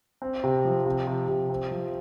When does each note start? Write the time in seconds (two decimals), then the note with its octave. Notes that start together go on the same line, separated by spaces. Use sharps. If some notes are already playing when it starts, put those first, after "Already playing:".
0.22 C4
0.44 C3
0.65 F3
0.86 C3
1.07 C3
1.28 C3
1.50 C4
1.71 F3